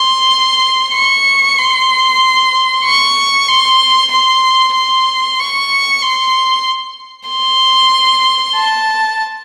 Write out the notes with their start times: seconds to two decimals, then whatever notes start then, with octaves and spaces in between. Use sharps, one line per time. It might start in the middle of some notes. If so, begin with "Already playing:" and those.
Already playing: C6
0.94 C#6
1.58 C6
2.85 C#6
3.48 C6
4.12 C6
4.75 C6
5.39 C#6
6.02 C6
7.29 C6
8.56 A5